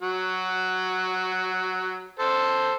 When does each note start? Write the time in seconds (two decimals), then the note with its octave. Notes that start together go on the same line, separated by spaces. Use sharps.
0.02 F#3 F#4
2.19 A4 C5 A5